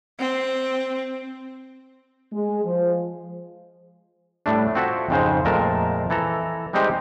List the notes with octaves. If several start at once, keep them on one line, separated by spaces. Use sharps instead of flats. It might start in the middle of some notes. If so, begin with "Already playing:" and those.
C4
G#3
F3
A2 G3 A3 D4
C4 F4 F#4 A4 C#5 E5
F2 G#2 C#3 G#3 C5
F2 A#2 G#3 A3 A#4 A5
E3 A4 A#5
G3 G#3 C4 D#4 G4 C5